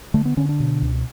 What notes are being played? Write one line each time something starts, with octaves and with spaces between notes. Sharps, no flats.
D3 A3
B3
D3 C#4
D4
B2
C#2